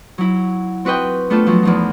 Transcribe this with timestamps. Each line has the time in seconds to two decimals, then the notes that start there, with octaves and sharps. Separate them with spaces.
0.18 F#3 E4
0.85 C4 F#4 B4 D#5 G5
1.30 A3 B3 D4 F4 A4
1.46 F3 F#3
1.63 E2 F3 D#4